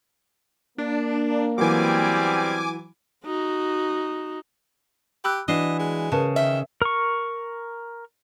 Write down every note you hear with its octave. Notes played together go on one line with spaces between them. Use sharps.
A#3 D4
E3 F#3 G3 B3 C4 G#5 D6
D#4 F#4
G4 B5 E6 F#6
E3 D4 F#4 D#5 C7 G7
G#3
C#3 A#4 B4 A5
D#3 E5
A#4 C#6